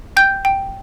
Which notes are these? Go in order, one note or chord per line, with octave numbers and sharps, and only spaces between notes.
G5 G6
G5